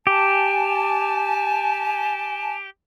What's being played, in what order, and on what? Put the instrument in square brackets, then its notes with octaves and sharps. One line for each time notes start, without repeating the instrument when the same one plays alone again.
[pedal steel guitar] G4 [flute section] G#5 A5